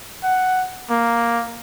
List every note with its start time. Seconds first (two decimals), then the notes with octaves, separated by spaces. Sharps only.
0.23 F#5
0.90 A#3